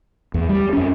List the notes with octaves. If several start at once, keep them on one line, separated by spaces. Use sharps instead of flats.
E2
G3
F2 C#4